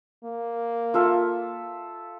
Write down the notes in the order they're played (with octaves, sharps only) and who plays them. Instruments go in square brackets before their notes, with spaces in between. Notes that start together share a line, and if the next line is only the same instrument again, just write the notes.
[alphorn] A#3
[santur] F4 A4 E5